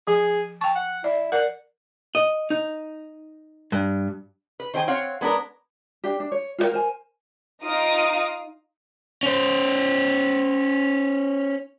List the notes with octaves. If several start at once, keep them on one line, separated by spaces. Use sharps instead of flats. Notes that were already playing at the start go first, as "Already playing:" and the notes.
F3 G#4
G5 A5 C#6
F#5
E4 D5
A#4 D5 F#5
D#5
D#4
G2
B4
D#3 C5 G5 G#5
C4 C#5 F5 F#5
G#3 B3 D4 A#4
D4 G4
D4
C#5
F4 A4 A#4 G5
A#4 C5 G#5
D#4 F4 F5 D#6 A#6 D7
C#4 C5